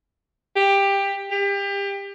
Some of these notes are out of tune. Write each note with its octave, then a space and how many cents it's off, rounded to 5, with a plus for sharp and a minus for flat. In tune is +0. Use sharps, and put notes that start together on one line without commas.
G4 +15
G4 +30